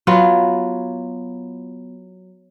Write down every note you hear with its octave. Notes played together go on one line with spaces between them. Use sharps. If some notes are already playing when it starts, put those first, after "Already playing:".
F#3 B3 F4